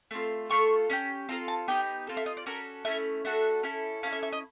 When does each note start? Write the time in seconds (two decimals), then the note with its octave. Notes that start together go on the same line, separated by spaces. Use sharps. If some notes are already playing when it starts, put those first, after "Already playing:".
0.11 A3 C4 F4
0.50 A3 C4 F4 A4 C#6
0.90 C#4 E4 G4
1.29 C4 F4 A4 A#5
1.48 A5
1.68 B3 D#4 G4 G5
2.07 C4 F4 A4
2.17 E5
2.26 D#5
2.37 D5
2.46 C#4 F#4 A4 A#4
2.85 A3 C#4 E4 E5
3.25 A3 D4 F#4 A4 E5
3.63 C#4 E4 A4
4.03 C#4 E4 A4 F5
4.12 E5
4.23 E5
4.33 D#5